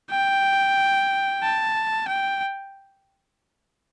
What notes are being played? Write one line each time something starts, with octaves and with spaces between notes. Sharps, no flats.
G5
A5
G5